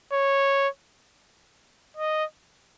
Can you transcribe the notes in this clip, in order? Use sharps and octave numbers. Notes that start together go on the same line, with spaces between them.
C#5
D#5